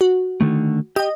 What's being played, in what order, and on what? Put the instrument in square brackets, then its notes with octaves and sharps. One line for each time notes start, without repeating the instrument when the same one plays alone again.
[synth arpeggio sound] F#4
[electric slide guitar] D3 D#3 A3
[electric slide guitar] G4 G5 [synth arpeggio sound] D#5